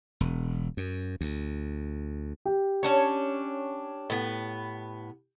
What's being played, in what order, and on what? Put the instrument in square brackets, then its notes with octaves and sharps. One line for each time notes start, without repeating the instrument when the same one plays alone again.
[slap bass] E1
F#2
D2
[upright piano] G4
[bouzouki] C#4 D4 C#5
A2 B3